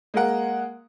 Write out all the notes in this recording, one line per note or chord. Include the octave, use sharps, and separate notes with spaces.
G#3 A#3 A#4 F#5